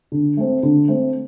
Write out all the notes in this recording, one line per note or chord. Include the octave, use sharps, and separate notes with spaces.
D3
A3 C4
D3
A3 C4